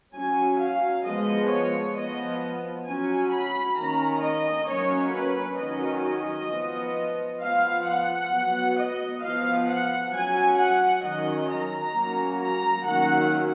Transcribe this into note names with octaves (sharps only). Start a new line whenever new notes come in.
F#3 C#4 G#5
F5
F3 G#3 B3 D#5
C#5
F3 B3 D#5
F#3 C#4 G#5
B5
D#3 A#3 C#4 A#5
D#5
F#3 A#3 C#4 C#5
B4
D#3 F#3 C#4 D#5
D#5
F3 B3
F3 B3 F5
F#5
F#3 B3
D#5
F3 B3 F5
F#5
F#3 C#4 G#5
F#5
D#3 F#3 C#4 D#5
A#5
F#3 A#3 C#4
A#5
D#3 F#3 A#3 C#4 F#5